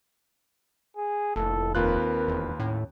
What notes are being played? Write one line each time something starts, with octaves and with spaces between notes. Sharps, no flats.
G#4
F1 D2 A#2 E4 A4
D#2 C4 F4 A#4 B4 F#6
E1
A2 C#4